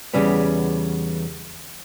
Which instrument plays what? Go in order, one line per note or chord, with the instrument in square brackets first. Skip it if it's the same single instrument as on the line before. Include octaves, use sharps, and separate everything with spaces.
[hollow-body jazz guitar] E2 G2 C#3 G3 B3